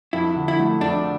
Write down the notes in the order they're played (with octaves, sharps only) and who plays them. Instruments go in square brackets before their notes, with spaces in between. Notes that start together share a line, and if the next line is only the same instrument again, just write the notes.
[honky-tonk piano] F2 [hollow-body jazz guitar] E4
[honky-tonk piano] D3
[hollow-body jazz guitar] E4
[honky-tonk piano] A3
[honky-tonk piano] F2 [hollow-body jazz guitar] D4